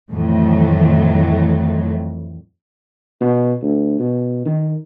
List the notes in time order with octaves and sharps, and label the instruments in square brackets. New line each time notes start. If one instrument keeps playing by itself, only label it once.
[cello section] F2 A2 D#3 E3 F#3
[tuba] B2
D2
B2
D#3